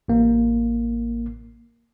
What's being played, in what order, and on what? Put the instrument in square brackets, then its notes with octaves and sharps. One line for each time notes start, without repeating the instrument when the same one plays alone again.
[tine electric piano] A1 A#3